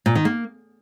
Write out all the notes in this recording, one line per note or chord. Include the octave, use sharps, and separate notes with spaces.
A#2
D#3
A#3